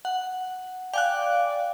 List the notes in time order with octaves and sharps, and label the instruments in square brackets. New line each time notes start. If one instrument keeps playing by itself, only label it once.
[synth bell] F#5
[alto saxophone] D5 [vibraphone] F5 [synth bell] G5 G#5 F#6